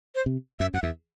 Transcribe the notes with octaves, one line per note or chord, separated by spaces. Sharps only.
C5
C3
F#2 E5
F#2 F#5
E2 E5